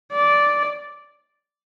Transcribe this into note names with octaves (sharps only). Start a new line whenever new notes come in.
D5